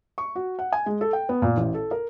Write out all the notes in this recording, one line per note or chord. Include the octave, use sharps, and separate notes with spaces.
C#6
F#4
F#5
G#5
G#3
A4
G5
B3
A#2
A1
A4
A#4